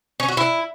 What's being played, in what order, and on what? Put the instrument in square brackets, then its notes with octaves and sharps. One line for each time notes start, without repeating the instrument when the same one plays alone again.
[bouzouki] C#4
F#4
E4